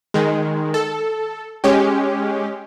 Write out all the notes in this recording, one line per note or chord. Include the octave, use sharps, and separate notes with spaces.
D#3 G#3
A4
G#3 C#4 G4